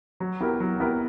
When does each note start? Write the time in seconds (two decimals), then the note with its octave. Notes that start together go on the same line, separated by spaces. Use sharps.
0.20 F#3
0.41 B3 E4 G4 A#4
0.60 F#3
0.80 B3 E4 G4 A#4